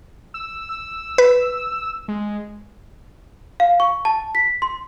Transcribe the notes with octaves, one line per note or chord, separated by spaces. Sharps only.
E6
E6
B4
G#3
F5
C#6
A5
B6
C6